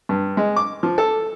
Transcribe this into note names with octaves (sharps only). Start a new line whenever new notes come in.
G2
G#3
D6
F3
A4